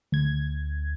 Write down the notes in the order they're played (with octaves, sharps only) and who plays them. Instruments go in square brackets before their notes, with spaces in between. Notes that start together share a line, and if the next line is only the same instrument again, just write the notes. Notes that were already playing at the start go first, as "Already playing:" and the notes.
[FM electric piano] D2 G#6